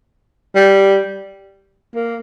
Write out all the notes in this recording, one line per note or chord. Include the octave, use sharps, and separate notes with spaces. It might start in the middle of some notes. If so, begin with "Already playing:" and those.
G3
A#3